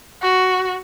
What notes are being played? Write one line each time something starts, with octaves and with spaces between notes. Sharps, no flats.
F#4